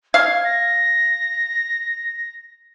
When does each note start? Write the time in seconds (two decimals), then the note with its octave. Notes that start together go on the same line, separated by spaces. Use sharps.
0.14 F5 G#6
0.45 A#6